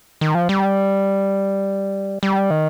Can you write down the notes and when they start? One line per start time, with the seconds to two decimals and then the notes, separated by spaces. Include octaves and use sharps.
0.21 D#3
0.35 F3
0.49 G3
2.23 G3
2.51 D#3